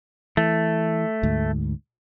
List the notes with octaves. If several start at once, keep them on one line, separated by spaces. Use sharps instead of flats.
E3 A3
D2 G#2